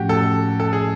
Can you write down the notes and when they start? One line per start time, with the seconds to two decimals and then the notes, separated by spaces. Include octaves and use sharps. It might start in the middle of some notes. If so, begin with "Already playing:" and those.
Already playing: A2 F3 A3 C#4 F#4 G4
0.09 A4
0.60 A4
0.73 G#4